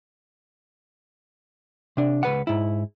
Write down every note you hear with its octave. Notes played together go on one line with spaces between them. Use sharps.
C3 D4
C#2 B4 F#5
G#2 E4